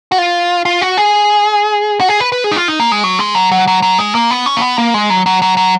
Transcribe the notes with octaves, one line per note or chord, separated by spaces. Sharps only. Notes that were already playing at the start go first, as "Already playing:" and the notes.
F#4
F4
F4
F#4
G#4
F#4
G#4
B4
B4
G#4
D#4
F4
D#4
A#3
G#3
F#3
G#3
F#3
F#3
F#3
F#3
G#3
A#3
B3
C#4
A#3
B3
A#3
G#3
F#3
F#3
F#3
F#3